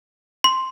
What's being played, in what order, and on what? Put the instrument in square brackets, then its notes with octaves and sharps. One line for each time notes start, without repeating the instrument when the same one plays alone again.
[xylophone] C6